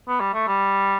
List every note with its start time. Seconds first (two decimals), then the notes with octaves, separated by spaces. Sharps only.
0.08 B3
0.20 G3
0.34 A3
0.47 G3